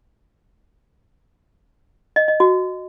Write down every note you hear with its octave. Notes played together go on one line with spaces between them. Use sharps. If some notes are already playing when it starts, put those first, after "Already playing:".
D#5
D#5
F#4